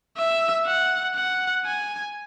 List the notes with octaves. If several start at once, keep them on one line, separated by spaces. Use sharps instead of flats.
E5
F#5
F#5
G#5